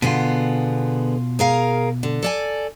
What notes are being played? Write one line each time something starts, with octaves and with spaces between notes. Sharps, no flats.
B2 D3 B3 F4 G#4
G#4 A#4 F5
D3
A4 D5 G#5